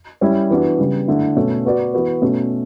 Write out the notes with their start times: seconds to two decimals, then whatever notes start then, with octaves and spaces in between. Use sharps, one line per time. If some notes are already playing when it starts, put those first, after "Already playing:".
0.21 G3 C#4 E4
0.50 E3 B3 D4 F#4
0.78 C#3 G3 B3
1.08 D3 A3 E4
1.36 B2 A3 C#4
1.65 B3 F#4 B4 D5
1.94 E3 B3 F#4 B4
2.22 B2 A3 C#4